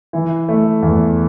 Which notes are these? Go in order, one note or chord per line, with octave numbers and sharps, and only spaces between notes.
E3
A3
E2